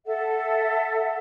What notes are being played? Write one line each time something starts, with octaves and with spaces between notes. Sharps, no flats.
A4 E5 F#5